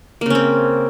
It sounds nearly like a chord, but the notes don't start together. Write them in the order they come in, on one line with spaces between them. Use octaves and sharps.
A#3 C#3 C#4 C4